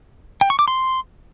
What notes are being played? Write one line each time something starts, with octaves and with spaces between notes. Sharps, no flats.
G5
C#6
D6
C6